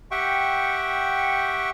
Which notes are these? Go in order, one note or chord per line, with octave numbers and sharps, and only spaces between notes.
G4 E5 F#5 G5 C#6